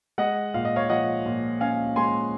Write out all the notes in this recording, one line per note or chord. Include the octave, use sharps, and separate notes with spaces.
G#3 D#5 F#5
A#2 F5
D#5
C#5 F5
F3 D#5 F#5
A#2
C#4 F5 G#5
G#3 G#5 C6